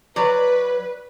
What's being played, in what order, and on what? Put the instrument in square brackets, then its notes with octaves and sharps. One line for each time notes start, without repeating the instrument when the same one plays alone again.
[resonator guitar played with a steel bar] F#3 D5 [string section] B4